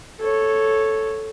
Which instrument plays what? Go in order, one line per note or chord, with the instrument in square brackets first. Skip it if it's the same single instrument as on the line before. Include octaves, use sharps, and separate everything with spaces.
[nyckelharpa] A4 C#5